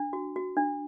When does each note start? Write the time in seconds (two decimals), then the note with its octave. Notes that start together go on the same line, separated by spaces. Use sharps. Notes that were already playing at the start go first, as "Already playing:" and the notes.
Already playing: D4
0.13 F#4
0.36 F#4
0.57 D4